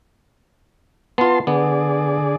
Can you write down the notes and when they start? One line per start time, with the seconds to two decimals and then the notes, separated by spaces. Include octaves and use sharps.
1.18 B3 F4 A5 C6
1.47 D3 B3 G#4 D5